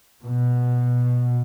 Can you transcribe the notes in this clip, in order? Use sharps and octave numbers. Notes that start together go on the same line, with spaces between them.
B2